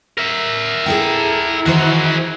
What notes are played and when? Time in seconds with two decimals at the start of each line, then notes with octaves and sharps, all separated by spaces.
0.18 A#4 E5
0.86 E4 G#4 A4 G5
1.66 D#3 E3 F#4 G#4 C5